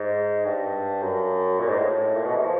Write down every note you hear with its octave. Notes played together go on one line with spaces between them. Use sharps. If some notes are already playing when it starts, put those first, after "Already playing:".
Already playing: G#2
G2
F#2
A#2
G#2
A2
A#2
B2
E3
F3